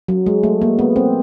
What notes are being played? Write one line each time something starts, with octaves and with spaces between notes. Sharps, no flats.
F#3
G#3
A3
A#3
B3
C4